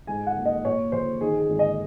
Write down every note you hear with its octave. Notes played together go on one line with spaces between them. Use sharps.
G#2 G#5
F#5
A#3
D#5
A#2 C#5
A#1 C5
D#3 G#4
G#4
G#1
D#5